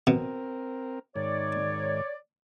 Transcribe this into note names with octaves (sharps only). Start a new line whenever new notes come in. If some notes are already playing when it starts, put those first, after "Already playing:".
B2 C4 A#4
G#2 D#3 C#5 D5